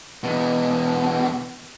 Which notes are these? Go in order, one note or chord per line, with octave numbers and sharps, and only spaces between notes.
E2 B2